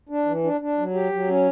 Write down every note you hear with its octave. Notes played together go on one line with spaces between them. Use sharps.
D4
E3
D4
D4
F#3
G4
F#3
C#4